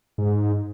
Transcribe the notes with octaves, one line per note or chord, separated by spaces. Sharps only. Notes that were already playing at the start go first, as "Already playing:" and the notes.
G#2